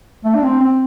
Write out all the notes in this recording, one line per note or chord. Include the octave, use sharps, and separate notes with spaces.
A3
D4
C4
C4